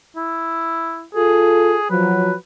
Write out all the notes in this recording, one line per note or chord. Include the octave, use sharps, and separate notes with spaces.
E4
F4 G#4 A4
F3 F#3 B4